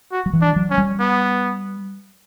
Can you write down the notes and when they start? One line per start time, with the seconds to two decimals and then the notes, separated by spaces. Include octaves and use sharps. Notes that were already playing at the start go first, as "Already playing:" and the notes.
0.12 F#4
0.26 F#3
0.33 E3
0.42 D4
0.56 F#3
0.71 C#4
0.78 G3
1.00 B3